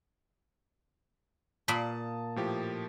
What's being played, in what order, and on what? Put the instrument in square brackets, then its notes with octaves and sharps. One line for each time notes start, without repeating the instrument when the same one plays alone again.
[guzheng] A#2 A#3 B5 [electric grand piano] A5 D#6
[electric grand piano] A2 F3 G4